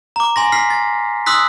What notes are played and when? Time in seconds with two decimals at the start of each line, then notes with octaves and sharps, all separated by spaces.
0.16 A#5 D6
0.36 G#5 C6 A#6
0.52 F6 B6 C7
0.70 A6
1.26 C6 D#6 E6 F#6 B6